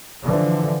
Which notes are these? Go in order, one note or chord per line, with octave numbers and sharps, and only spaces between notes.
D3 E3 F3